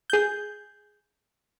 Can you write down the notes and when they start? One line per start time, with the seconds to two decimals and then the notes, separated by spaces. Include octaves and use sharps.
0.10 G#4 G6